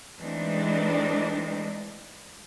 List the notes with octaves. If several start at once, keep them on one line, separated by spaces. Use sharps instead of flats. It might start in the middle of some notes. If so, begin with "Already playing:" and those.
E3 G#3 A3 C4 D4 D#4